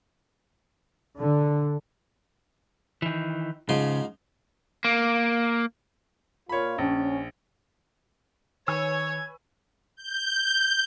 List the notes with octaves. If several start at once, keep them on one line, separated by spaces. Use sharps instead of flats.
D3
D#3 E3
G#2 C#3 F3 C6
A#3
A#2 F4 C#5 B5
A#1 C#4
D#3 B4 C#5 G#5 E6 G#6
G6